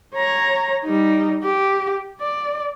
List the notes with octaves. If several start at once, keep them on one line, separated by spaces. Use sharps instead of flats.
C#5 A#5
G3 D#4
G4
D5